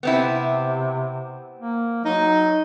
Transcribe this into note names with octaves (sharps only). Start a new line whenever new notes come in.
C3 B3 C4 E4
A#3
F#3 D#4